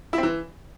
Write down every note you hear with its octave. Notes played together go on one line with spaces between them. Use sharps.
E4
C4
E3